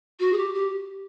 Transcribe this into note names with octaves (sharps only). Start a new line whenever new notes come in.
F#4
G#4
G4
G4